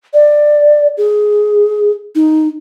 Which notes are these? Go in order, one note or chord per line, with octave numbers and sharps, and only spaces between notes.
D5
G#4
D#4